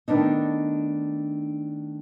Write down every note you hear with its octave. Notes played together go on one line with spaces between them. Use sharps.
D#3 A3 B3 D4 D#4